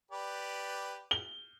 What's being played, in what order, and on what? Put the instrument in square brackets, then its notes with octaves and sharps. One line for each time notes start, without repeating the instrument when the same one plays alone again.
[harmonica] G4 B4 D5
[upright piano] G7